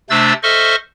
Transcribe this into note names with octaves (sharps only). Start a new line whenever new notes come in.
C3 A3 D4 C5 E6 A6
A4 C5 D#5 E5 C#6 F6